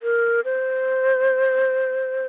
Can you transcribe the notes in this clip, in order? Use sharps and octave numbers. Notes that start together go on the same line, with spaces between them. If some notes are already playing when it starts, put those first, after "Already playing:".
A#4
C5